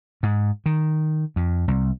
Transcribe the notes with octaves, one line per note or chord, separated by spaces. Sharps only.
G#2
D#3
F2
C2